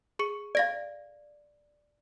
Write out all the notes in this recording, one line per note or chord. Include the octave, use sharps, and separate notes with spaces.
G#4 C#6 C#7
D5 F5 A#6 D7